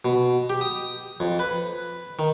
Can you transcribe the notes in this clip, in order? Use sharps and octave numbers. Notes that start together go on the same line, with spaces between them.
B2
G4
D#6
F2
B4
D#3